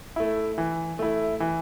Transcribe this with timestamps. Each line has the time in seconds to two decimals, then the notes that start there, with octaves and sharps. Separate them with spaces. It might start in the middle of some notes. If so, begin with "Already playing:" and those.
0.16 A3 E4
0.58 E3
0.99 A3 E4
1.40 E3